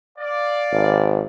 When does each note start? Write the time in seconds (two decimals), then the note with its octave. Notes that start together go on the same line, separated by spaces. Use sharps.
0.19 D5 F5
0.72 G#1